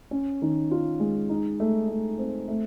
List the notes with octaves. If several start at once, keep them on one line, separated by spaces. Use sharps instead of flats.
C#4
D#3
F4
G#3
D#4
A3
A3
C4
A3